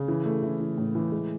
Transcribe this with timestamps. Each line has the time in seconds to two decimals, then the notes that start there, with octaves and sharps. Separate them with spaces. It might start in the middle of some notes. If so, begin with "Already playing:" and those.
Already playing: C#3
0.08 E3
0.25 A3
0.43 E3
0.60 E3
0.77 A2
0.95 E3
1.12 G#3